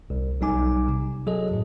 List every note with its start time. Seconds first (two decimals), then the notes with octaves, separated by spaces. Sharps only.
0.10 C2
0.41 B1 G3 D#4 G#5 D6
0.88 C3
1.27 F#3 G#4 A4 D#5
1.51 F#2 A2